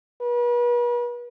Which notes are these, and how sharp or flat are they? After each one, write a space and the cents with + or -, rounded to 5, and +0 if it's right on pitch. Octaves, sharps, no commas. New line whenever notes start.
B4 -40